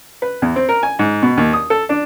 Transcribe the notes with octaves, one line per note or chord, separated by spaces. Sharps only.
B4
E2
C4
A#4
G#5
G#2
B2
D#2
D#6
A4
D4